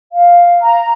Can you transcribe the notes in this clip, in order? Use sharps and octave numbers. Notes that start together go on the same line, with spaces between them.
F5
A#5